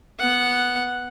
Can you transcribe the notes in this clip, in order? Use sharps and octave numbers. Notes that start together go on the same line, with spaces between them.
B3 F#5